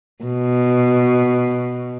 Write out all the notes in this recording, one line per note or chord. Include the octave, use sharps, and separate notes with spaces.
B2